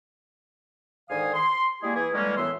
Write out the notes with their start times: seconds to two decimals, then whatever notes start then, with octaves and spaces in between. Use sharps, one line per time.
1.09 G#2 D3 D#3 F5 G#5 D#6
1.34 C6
1.82 G3 G#3 A#3 E4 G#4
1.95 E3 E4 G#4
2.14 D3 E3 G3 G#3 A#3 C#4
2.36 F#2 A2 E3 B3 E5 C6